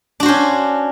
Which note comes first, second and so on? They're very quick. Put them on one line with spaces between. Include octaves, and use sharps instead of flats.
D4 F#4 C5 C#4